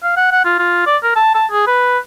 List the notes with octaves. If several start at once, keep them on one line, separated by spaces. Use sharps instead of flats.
F5
F#5
F#5
F4
F4
D5
A#4
A5
A5
G#4
B4